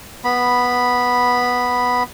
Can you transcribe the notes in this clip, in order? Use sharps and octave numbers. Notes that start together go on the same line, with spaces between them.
B3 B5